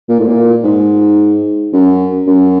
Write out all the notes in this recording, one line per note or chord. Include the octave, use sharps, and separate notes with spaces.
A#2
A2
A#2
G#2
F#2
F#2